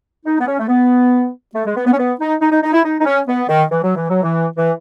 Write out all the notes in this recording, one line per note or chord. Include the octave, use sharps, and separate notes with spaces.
D#4
B3
C#4
A3
B3
A3
G#3
B3
B3
C#4
B3
D#4
D#4
D#4
D#4
E4
D#4
D#4
C#4
B3
D#3
E3
F#3
E3
F#3
E3
E3